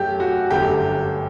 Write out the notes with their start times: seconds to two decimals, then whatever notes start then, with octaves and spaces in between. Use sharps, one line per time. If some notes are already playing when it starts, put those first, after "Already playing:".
Already playing: F#2 F#3 A3 G4
0.20 F#4
0.51 G1 F#2 D3 A3 G4